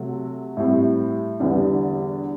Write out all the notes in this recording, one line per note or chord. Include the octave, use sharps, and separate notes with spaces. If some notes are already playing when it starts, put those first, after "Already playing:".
Already playing: C3 F#3 A3
A2 G3 C4
E2 D3 G3 B3 D4